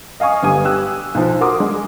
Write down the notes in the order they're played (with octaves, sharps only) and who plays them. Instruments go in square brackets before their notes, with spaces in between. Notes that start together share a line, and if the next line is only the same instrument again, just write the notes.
[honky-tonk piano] D#5 F5 G#5 C#6 D#6
G1 G3 G#5 D#6
G4 E6 F#6
B1 F3
F#4 A#4 C6 D6 D#6
G#3